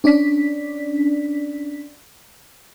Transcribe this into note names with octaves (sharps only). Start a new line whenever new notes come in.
C#4 D4 D5 B6